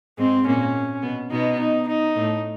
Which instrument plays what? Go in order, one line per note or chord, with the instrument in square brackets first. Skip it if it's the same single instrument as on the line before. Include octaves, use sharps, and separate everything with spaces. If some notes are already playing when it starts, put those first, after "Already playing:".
[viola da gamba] G#2 G#3 [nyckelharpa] C4
[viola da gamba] A#2 A#3 [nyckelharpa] C#4
[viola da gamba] B2 B3
[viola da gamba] B2 B3 [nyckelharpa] D#4
[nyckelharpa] D#4
D#4
[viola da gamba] A2 A3